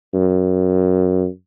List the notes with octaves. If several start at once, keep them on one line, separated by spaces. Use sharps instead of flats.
F#2